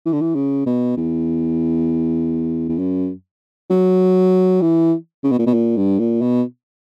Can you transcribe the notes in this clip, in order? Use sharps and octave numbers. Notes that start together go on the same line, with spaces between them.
E3
D3
E3
C#3
B2
E2
E2
F#2
F#3
E3
C#3
B2
A#2
B2
A#2
G2
A#2
B2